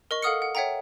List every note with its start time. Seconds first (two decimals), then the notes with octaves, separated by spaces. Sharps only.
0.11 A#4 D#5 C#6
0.22 A4 F5 F#5 D#6 F6 C#7
0.42 F#5
0.55 C#5 E5 F#5 G5 A#5